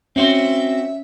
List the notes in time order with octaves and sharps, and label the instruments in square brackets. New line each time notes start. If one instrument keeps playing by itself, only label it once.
[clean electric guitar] C4 F#4 C5 [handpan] C#4 [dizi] E5